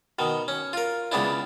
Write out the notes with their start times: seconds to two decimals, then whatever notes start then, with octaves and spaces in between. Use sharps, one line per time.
0.19 B2 D#3
0.48 C#4
0.73 F4 A#4
1.12 C#2 C#3 B3 D4 E4